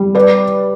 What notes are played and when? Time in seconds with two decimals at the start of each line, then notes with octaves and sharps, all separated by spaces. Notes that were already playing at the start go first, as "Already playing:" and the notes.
Already playing: G3
0.15 B4 D5